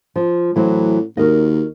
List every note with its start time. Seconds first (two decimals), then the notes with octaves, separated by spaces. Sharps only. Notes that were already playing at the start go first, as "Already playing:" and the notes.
0.16 F3
0.56 A2 E3 F#3 C4
1.17 D#2 F#4 A#4 D#5